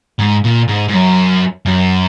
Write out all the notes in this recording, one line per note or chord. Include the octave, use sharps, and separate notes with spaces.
G#2
A#2
G#2
G#2
F#2
F#2